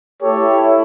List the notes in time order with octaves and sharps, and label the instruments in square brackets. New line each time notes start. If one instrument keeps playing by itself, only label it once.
[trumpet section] A3 E4 G4 A4 C#5